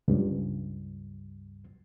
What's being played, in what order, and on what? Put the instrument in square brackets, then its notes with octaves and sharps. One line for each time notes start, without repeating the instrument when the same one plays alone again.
[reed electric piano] C#2 G2